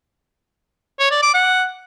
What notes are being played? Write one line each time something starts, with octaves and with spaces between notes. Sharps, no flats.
C#5
D5
D6
F#5